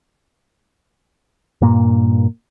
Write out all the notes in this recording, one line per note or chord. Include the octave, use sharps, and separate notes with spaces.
G2 A#2 A#3